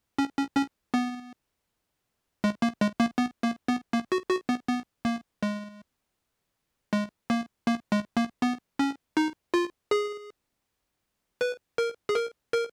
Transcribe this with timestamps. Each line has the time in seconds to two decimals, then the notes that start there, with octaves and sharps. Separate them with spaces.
0.18 C#4
0.37 C#4
0.56 C#4
0.94 B3
2.44 G#3
2.62 A#3
2.81 G#3
3.00 A#3
3.18 B3
3.43 A#3
3.68 B3
3.93 A#3
4.12 F#4
4.30 F#4
4.49 B3
4.68 B3
5.05 A#3
5.43 G#3
6.93 G#3
7.30 A#3
7.67 A#3
7.92 G#3
8.17 A#3
8.42 B3
8.79 C#4
9.17 D#4
9.54 F4
9.91 G#4
11.41 B4
11.78 A#4
12.09 G#4
12.15 A#4
12.53 A#4